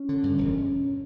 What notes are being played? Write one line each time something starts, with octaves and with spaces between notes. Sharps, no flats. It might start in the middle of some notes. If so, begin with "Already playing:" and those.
Already playing: C#4
D3
G2
E1